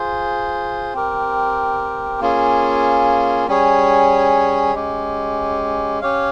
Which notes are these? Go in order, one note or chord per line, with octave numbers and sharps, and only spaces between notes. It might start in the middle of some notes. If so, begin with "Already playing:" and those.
Already playing: F4 G#4 C5
C4 G4 A#4
A#3 C#4 F4 G#4
G3 C#4 G#4 C#5
G#3 C#4 G4
C#4 G4 C#5 F5